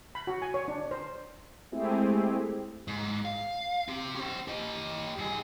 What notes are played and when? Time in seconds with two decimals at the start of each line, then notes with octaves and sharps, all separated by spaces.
0.15 B5
0.27 F#4
0.42 G#5
0.54 C#5
0.68 D4
0.91 C5
1.72 G#3 A3 C4 E4 G4 G#4
2.88 G#2
3.25 F5
3.88 C4 G4
4.16 C#4 C5
4.48 G4 D#5
5.18 G2 G#4